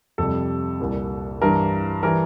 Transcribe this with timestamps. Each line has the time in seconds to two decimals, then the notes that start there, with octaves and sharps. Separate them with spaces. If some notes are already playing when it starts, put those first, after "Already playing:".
0.18 F2 C3 G3 A4
0.80 C2 A#2 G3
1.41 G2 E3 G3 A#4
2.03 E3 G3 A#4